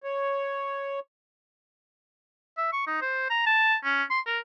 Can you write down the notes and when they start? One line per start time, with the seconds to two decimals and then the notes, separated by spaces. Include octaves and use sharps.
0.04 C#5
2.58 E5
2.73 C#6
2.87 D#4
3.02 C5
3.30 A#5
3.46 A5
3.84 C#4
4.10 C6
4.27 A#4